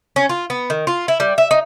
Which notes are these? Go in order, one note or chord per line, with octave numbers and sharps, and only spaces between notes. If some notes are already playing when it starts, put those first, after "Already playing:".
C#4
F4
B3
D#3
F4
E4
G3
E5
D#4